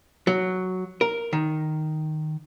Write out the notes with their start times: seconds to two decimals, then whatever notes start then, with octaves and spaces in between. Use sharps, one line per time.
0.27 F#3
1.01 A#4
1.33 D#3